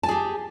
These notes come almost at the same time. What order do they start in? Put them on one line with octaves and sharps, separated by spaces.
A5 G#5 G#4 G4